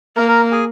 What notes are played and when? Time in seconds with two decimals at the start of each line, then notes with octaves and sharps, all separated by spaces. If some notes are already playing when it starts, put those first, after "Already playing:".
0.17 A#3 A#4 A#5
0.29 A#4 A#5
0.52 G#4 G#5